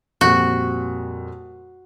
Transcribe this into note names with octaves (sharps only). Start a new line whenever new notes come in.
F2 A#2 G3 F#4